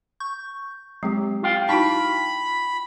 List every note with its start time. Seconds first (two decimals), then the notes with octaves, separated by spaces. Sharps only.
0.20 C#6 G6
1.03 F#3 G#3 C4 G4
1.43 F4 F5 G5
1.69 D#4 E4 F#4 A5 B5 C#6